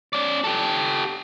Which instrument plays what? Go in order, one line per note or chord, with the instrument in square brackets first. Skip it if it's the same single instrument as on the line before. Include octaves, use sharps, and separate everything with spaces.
[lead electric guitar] C#4 D5
G4 A4